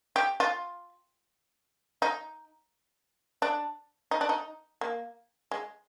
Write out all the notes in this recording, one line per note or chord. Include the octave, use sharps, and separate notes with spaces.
G4
F4
D#4
D4
D#4
D4
D#4
A#3
G#3